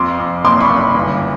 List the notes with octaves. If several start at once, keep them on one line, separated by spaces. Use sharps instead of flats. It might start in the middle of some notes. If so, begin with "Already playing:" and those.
Already playing: F2 C6 D6
F2
F#1 C6 D6
B5 C#6
F#1
G1